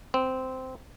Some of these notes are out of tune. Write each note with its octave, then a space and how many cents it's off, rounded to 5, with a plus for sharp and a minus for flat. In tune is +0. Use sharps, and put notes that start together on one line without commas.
C4 -10